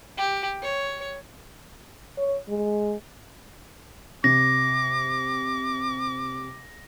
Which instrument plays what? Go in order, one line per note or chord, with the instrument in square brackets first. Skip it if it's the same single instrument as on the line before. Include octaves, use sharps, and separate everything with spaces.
[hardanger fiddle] G4
C#5
[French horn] C#5
G#3
[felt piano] C3 [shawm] D6 [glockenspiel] A#6